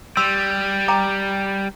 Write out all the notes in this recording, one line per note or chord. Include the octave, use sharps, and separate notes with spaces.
G3 C6 E6
G5 A#5 D6